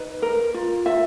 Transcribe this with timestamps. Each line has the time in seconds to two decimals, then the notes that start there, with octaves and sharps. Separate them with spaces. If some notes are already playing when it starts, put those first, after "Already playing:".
Already playing: D#4 B4 D#5
0.22 A#4
0.54 F4
0.86 F4 E5